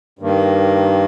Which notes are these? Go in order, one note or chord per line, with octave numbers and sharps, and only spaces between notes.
G2 D#3 A#3